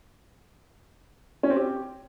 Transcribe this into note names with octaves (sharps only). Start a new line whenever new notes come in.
C#4
C4
G4